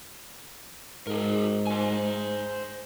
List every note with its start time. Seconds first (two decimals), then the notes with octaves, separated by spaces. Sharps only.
1.07 G#2 G#4 A#4
1.67 C5 G#5